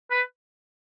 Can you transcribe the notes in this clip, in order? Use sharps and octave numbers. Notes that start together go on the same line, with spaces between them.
B4